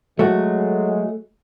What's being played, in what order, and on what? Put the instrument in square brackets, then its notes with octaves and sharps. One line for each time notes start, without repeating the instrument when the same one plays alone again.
[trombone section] F#3 G#3 [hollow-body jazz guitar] A3 F#4